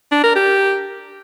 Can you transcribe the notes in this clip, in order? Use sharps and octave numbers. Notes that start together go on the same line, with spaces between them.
D4
A#4
G4